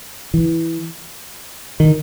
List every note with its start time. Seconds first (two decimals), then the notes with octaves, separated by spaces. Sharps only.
0.34 E3
1.80 D#3